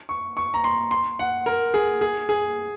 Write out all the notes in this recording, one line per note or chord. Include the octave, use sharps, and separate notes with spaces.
C#6
C#6
A#5
C6
C6
F#5
A#4
G#4
G#4
G#4